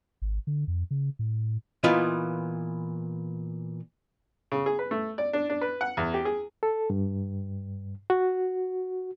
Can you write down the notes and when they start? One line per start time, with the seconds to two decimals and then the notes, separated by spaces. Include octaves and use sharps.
0.22 G#1
0.47 D3
0.68 F2
0.91 C#3
1.19 A2
1.84 A#2 E3 B3 F4 D#5
4.52 C#3
4.66 G#4
4.79 B4
4.91 A3
5.18 D5
5.33 D4
5.50 D4
5.61 B4
5.81 F#5
5.97 E2
6.14 G4
6.25 G#4
6.63 A4
6.90 G2
8.10 F#4